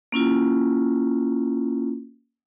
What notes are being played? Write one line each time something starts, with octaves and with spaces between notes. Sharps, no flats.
A#3 C#4 E4 F4